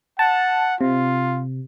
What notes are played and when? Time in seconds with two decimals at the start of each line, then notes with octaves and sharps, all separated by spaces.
0.19 F#5 A5
0.81 C3 F4